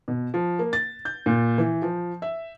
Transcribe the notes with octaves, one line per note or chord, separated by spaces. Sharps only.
B2
F3
A#3
A6
G6
A#2
E3
F3
E5